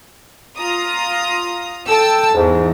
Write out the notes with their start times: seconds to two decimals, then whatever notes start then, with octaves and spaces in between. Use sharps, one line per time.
0.57 F4 A#5 D#6
1.89 A4 G5 A5 E6
2.35 E2 G#2